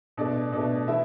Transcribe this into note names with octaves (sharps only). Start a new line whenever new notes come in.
B2 A3 D4 D5
B2 A3 D4 D5
E3 A3 E4 E5